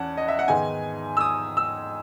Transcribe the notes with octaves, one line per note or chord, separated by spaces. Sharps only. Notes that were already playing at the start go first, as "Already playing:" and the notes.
Already playing: E2 C#4 F#5 A5
D#5
E5
F#5
G#2 D#3 G#3 B3 G#5
E6
D#6
E6